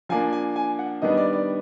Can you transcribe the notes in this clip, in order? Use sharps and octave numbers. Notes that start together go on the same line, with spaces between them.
F3 A#3 D4 G#5
G#5
G#5
F#5
D#3 G3 B3 D4 D#5
D5
D5